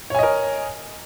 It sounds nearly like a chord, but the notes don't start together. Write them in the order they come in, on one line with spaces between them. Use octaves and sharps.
C#5 G#5 D#5 A#4